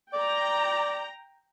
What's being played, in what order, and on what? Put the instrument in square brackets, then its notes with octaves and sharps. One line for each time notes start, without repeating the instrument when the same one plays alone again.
[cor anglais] D5 [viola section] G5 A#5